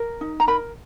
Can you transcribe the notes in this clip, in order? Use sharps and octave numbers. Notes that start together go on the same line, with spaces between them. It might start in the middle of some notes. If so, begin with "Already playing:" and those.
Already playing: A#4
D#4
A#5
A#4 B5